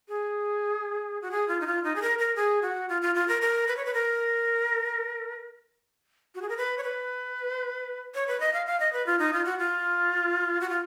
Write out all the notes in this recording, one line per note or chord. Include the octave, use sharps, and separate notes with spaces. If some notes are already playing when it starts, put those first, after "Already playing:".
G#4
F#4
G#4
F4
D#4
F4
D#4
G#4
A#4
A#4
G#4
F#4
F4
F4
F4
A#4
A#4
B4
C#5
B4
A#4
F#4
G#4
A#4
B4
C#5
B4
C#5
B4
D#5
F5
F5
D#5
B4
F4
D#4
F4
F#4
F4
F#4
F4